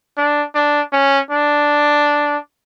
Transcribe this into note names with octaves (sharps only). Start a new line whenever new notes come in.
D4
D4
C#4
D4